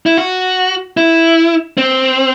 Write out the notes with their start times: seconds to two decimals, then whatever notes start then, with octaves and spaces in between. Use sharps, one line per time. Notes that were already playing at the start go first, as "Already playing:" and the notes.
0.06 E4
0.17 F#4
0.97 E4
1.78 C4